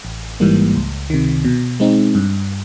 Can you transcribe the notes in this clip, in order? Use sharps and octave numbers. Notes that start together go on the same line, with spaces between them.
A1
G#2 E3 G3 A#3
C#2
C3 D#3
B2
G#3 C4 D#4
G2